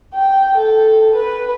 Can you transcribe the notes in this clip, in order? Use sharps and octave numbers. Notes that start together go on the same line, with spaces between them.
G5
A4
B4